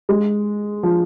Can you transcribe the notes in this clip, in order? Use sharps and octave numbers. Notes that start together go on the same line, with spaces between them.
G#3
F3